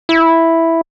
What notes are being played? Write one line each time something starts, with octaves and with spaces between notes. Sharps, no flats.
E4